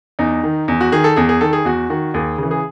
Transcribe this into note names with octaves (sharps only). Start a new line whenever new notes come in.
E2 D#4
D#3
E2
F#4
D#3 G#4
A4
E2 G#4
G#4
D#3 A4
G#4
E2 F#4
D#3 F#4
D#2 G#4
C#3 E3
G#4